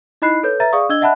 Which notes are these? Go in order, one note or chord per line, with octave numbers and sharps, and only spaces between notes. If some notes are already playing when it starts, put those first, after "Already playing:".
D#4 E4 D#5 B5 F#6 C7
A4 B4 C#5 G6
B4 E5 A#5 A6
G#4 D5 F5 C#6 D#6
D4 D#5 E6 G#6 G7
D#5 E5 F#5 A5 B5 F#6